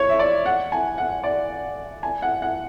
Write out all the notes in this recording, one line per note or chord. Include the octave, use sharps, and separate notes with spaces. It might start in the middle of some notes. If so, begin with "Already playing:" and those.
Already playing: C#5
E5
D5
F#5
G#5
F#5
D5
G#5
F#5
F#5